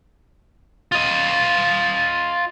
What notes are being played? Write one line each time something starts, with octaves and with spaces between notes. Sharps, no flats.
F4 D#5